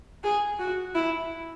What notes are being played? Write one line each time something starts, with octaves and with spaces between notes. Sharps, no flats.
G#4
F#4
E4